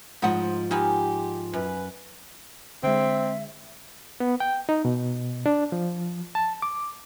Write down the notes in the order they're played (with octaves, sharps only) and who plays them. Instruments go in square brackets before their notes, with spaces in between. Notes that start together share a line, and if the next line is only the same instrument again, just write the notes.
[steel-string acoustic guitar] G#2 F3 [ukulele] D#4 F#5 [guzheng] B5
[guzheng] B3 G#4 A#4 [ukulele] D#4 [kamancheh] G4
[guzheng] F#2 [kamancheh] B4
[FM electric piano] D3 G#3 [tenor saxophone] C4 [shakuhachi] E5
[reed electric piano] B3
G5
D#4
B2
D4
F3
A5
D6